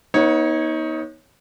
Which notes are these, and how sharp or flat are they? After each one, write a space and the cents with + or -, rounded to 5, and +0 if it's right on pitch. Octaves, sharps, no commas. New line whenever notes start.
B3 -30 D#4 +25 C#5 -15